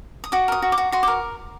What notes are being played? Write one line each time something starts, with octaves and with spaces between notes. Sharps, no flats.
D#6
F#4 D6
A#4 D#6
F#4
D6
F#4
F#4 C6
A#4 D6